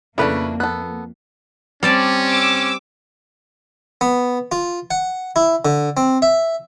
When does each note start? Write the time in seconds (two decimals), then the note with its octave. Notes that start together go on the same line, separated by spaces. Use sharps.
0.18 F2 C#3 A3 A#3 D4 E4 B4
0.60 B3 A4 F#6
1.83 G3 C4 C#4 D5 A5
2.27 D6 E6
4.01 B3
4.52 F4
4.91 F#5
5.36 E4
5.65 D3
5.97 C4
6.22 E5